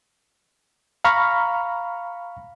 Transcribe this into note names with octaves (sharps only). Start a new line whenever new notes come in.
F5 A#5 B5 C#6 F6